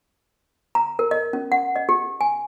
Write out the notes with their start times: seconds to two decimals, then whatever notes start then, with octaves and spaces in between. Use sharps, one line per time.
0.75 A#5
0.99 A#4
1.11 D#5
1.33 C#4
1.52 F#5
1.76 D#5
1.89 G4
2.21 G#5